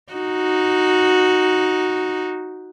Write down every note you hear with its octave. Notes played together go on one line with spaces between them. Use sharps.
D#4 F#4